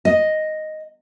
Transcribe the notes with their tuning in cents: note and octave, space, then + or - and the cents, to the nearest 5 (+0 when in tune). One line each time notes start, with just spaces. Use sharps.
D#5 +0